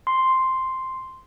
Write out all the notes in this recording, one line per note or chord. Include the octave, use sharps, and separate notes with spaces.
C6